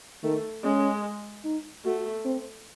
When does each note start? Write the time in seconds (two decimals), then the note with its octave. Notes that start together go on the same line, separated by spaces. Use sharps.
0.23 D#3 A3
0.63 G#3 C#4
1.45 D#4
1.85 A3 F#4
2.25 C4